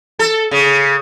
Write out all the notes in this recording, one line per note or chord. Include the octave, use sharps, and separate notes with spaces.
A4
C#3